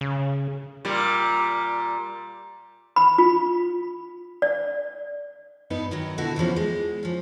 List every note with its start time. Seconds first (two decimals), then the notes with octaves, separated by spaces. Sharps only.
0.01 C#3
0.85 A#2 G3
2.96 B5
3.18 F4
4.42 D5
5.70 G2 B3 D#4
5.91 D#3 E3 F#3
6.18 B2 D3 E4 F#4
6.36 E2 E3 F3 C#4
6.56 G#3
7.03 F3 C#4